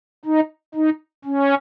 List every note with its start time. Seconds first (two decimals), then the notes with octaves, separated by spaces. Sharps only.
0.25 D#4
0.74 D#4
1.25 C#4